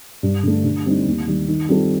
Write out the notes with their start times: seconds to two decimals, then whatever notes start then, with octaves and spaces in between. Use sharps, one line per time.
0.23 G2
0.43 D3 A3
0.64 D3
0.85 G3 C4 D#4
1.06 D#2
1.27 D#3 G3
1.48 D#3
1.69 G3 C4 F4 A4